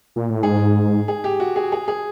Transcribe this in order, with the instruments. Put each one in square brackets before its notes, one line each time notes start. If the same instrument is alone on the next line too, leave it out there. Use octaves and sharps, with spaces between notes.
[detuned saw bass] A#2
A2
[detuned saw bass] G#2 [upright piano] G#4
[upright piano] G#4
G4
F#4
G#4
G#4
G#4